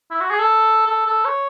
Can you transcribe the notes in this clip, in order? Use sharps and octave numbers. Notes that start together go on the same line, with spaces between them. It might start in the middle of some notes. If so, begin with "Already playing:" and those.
E4
F#4
G#4
A4
A4
A4
C#5